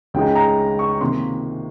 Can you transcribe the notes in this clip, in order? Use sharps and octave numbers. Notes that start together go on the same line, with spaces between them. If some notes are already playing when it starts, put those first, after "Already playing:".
C#2 C#3 G#3 D#4 G5
A#5
C#6
C3 D#3 A#3 C6